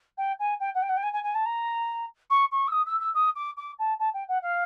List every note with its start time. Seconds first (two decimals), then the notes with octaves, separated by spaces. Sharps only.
0.17 G5
0.39 G#5
0.60 G5
0.74 F#5
0.82 G5
0.89 F#5
0.96 G5
1.03 G#5
1.13 G#5
1.23 G#5
1.34 A5
1.45 A#5
2.30 C#6
2.51 C#6
2.67 E6
2.72 D#6
2.86 E6
3.00 E6
3.14 D#6
3.35 D6
3.57 D6
3.79 A5
3.99 A5
4.13 G5
4.28 F#5
4.42 F5